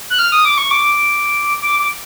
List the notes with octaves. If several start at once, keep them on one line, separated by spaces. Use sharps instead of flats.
F#6
F6
D#6
D6
C#6
D6
D6
D6